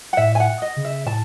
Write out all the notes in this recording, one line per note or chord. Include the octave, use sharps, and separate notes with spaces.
F#5
A2 E5
G#5
F#5
D#5
C#3
E5
A2 A5